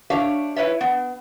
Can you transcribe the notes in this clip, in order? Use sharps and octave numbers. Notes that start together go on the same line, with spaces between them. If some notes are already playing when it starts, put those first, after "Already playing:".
D4 G4 C#5 E5 F5
E4 B4 C#5 E5
B3